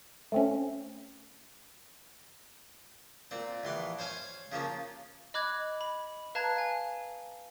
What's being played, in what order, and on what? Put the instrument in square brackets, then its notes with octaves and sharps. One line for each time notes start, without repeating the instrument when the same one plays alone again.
[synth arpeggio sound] A3 C4 C#4
[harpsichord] A#2 C4
A#1 E3 C6 D6
C5 C#5 F5 G#5
C#3 F3 A#3 C#4
[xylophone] D#5 B5 D6 F#6 G#6
B5
B4 F5 A5 A#5 F#6 G#6
F5 G#5